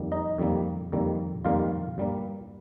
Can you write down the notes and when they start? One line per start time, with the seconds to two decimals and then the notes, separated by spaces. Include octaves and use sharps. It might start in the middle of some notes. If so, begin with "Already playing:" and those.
Already playing: F2 D#3 G3 A#3
0.12 D#4 D#5
0.38 F2 D#3 G3 A#3
0.92 F2 D#3 G3 A#3
1.45 F2 D#3 G3 A#3 F4 F5
1.98 G2 G3 A#3